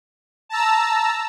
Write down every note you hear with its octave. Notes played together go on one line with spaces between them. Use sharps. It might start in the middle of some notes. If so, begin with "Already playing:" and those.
A5 A#5 E6